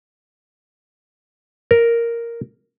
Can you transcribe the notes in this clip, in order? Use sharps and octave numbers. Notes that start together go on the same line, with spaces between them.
A#4